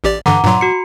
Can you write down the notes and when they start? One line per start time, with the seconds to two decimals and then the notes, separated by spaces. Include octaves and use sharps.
0.04 A1 G4 D5
0.26 G2 D3 E3 F#5 A#5 D6
0.44 G2 A#2 F#3 A#5 C6
0.61 F#4 C#7